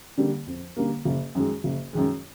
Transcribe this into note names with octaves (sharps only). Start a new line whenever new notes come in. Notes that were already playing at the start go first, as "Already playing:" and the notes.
D3 G3 A#3
F2
D3 G3 A#3
F#1
F#2 D#3 G#3
F#1
F#2 D#3 G#3